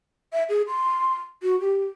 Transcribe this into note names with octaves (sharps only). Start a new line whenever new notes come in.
E5
G#4
C6
F#4
G4